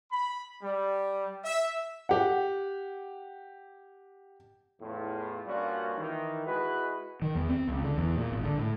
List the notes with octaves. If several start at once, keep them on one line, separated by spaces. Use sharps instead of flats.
B5
G3
E5
G4 F#5
E2 A2 F4
G2 A#2 G3 C#4 F4 F#4
D#3 E3
G#3 E4 F#4 B4
D#3
E2
C4
C#2
D3
E2
A#2
G#1
D3
A2